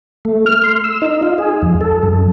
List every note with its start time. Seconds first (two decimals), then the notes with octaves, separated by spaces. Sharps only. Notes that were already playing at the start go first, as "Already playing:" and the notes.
0.25 A3
0.46 F6
0.64 C6
0.84 E6
1.02 D#4
1.22 F4
1.38 G#4
1.62 F2
1.81 A4
2.03 F#2